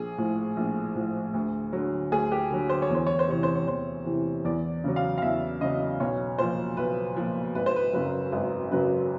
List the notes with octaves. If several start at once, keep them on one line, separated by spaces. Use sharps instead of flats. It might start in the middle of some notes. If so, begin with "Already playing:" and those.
Already playing: A#1 G#4
A2 F3
A#1
A2 F3
D2
D3 F#3
D2 G#4
G4
D3 F#3
C5
C#5
E2
C5
C#5
C5
C3 E3 C#5
C5
C#5
E2 C5
C3 E3
E2 D5
C#3 F#3
F5
F5
E2 E5
C#3 F#3 D#5
B1 C#5
A#2 F3 C5
B1 B4
A#2 F3
G#1 B4
C5
B4
F#2 C#3 F#3 B4
G#1 B4
F#2 C#3 F#3 B4